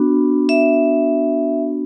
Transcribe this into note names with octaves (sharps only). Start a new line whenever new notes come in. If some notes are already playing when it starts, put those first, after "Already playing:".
Already playing: B3 D4 F#4
E5